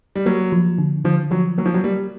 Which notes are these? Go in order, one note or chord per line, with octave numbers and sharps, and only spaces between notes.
G3
F#3 A#3
F3
D3
D3 F3
F3 F#3
F#3 A#3
F3
F#3
G3 A#3